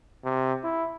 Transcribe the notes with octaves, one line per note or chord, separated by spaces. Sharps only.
C3
E4